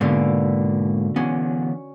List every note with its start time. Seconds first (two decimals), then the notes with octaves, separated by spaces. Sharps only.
0.01 G#2 B2 D3 A#3
1.16 D3 E3 B3 C#4